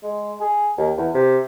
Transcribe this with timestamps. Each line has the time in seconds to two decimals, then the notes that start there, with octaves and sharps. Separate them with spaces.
0.03 G#3
0.41 G#4
0.78 D#2
0.98 E2
1.15 C3